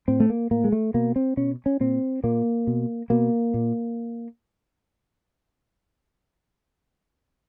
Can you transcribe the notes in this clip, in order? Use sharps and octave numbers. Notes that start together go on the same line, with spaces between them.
A2 C4
A3
A#3
A2 A#3
G#3
A3
B2 A#3
C4
B2 C#4
C#4
A#2 C4
A#2 A#3
B2
B2 A#3
A#2